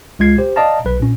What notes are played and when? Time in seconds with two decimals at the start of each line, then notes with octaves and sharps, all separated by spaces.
0.19 C#2 G#3 F4 G#6 C7
0.38 G4 C5
0.56 D5 D#5 F5 A5 A#5
0.85 B1 B4
1.00 A#2 C#4